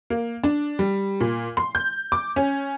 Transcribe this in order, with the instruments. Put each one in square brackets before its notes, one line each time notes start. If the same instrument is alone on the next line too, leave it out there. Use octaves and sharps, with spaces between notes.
[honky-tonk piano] A#3
D4
G3
A#2
C6
G6
D6
C#4